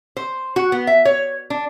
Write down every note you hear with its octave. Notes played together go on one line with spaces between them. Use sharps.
C5
F#4
B3
E5
C#5
D4